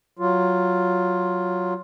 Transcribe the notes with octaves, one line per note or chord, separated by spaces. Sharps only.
F#3 F4